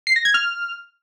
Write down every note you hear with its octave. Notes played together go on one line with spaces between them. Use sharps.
C7
A#6
G#6
F6